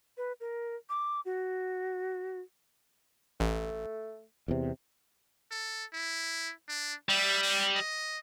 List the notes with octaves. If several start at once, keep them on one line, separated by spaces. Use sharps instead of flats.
B4
A#4
D6
F#4
A1 A3
E2 C3
A4
E4
D4
G3 E5
C4
D#5